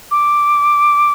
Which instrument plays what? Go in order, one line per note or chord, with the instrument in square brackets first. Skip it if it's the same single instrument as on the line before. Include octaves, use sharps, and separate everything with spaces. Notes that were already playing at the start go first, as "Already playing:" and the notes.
[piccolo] D6